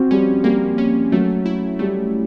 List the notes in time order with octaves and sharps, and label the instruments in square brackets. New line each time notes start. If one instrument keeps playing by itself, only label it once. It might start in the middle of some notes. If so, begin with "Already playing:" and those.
Already playing: [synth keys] F3 [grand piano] C4 F#4
[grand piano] G3 [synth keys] C#4
[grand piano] G3 [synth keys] A#3
[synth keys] C#4
[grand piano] F#3 [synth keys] A3
[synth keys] E4
[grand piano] G3 [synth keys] A3